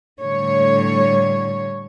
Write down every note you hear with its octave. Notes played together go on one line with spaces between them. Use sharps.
A2 D3 G3 C#5